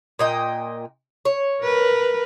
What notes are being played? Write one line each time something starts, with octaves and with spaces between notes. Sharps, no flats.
A#2 D#5 G5
C#5
A#4 B4